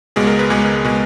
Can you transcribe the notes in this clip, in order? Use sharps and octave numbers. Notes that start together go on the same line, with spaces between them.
C#2 B2 G#3 G#4
A#4
B4
C#2 B2 G#3 G#4
B2 G#3